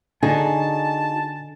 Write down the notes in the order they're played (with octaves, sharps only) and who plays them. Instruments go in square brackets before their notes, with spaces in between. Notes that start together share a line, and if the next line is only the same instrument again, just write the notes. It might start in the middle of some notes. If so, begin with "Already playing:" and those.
[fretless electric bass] D3 [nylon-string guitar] D#4 F#4 G#4 [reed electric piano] G#5 [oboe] A5